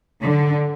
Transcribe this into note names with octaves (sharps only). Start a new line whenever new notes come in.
D3